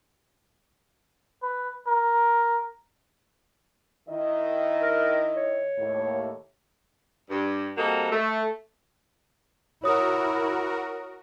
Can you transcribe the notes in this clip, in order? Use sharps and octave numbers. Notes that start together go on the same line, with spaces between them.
B4
A#4
D#3 E4 D#5
A#4
C#5
D#2 A2
G2
G3 A#3 C4 D#4 F#4 A4
A3
E4 F#4 A#4 C#5 D#6